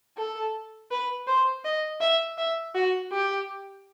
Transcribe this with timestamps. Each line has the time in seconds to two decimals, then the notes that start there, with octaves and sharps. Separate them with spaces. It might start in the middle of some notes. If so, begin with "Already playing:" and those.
0.17 A4
0.91 B4
1.27 C5
1.65 D#5
2.01 E5
2.38 E5
2.75 F#4
3.12 G4